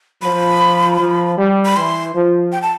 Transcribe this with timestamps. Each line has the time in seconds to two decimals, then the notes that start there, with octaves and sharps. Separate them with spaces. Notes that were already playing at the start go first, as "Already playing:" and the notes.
0.22 F3 B5
0.99 F3
1.38 G3
1.65 B5
1.76 E3 C6
2.14 F3
2.52 G5
2.62 A5